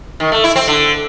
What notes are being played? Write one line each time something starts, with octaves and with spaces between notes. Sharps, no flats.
D#3
A3
E4
C4
D3